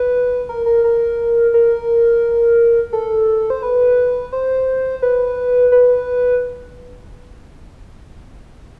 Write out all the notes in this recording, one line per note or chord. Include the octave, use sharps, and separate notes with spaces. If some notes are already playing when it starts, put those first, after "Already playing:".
Already playing: B4
A#4
A#4
A#4
A#4
A4
C5
B4
C5
B4
B4